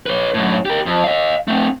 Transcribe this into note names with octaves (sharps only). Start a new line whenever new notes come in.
B4 C#5
F#2 A2
G4 A#4
F2
D#5 F5
A3 C4